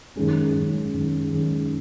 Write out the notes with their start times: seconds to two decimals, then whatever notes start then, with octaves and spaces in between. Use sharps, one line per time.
0.16 F#2 D#3 G#3 C#4
0.54 F#2 D#3 G#3 C#4
0.93 F#2 D#3 G#3 C#4
1.30 F#2 D#3 G#3 C#4